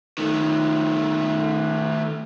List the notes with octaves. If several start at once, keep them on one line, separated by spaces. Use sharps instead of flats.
D#3 A3